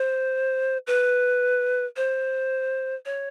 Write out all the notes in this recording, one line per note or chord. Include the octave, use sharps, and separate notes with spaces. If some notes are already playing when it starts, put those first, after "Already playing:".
Already playing: C5
B4
C5
C#5